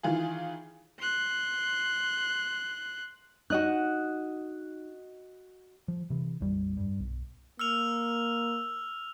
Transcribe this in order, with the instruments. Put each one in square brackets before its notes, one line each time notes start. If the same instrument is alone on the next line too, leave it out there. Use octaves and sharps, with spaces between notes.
[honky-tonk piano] D#3 E3 F4 G#4
[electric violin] C6 F#6
[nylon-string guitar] D#4 [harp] F#4 D#5 F#6
[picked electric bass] F3
C3 E3
A#1 F2 G3
G2
B1
[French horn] A#3 [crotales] E6 F6 F7